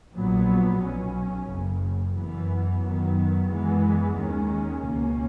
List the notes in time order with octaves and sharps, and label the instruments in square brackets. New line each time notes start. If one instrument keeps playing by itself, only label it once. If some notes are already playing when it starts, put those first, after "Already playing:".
[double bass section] A#1 A#2 F#3 B3
B1 B2 F#3 C#4
F#1 F#2 C#3
F#2 E3 B3
F#2 D#3 F#3 B3
F#2 E3 G#3 B3
D#2 D#3 G#3 C#4
C#2 B2 A#3 C#4